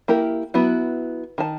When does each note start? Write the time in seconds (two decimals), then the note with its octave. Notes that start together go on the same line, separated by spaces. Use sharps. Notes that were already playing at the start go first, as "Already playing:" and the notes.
0.08 A#3 E4 G4 A#4
0.54 F#3 B3 E4 F#4
1.38 D#3 A5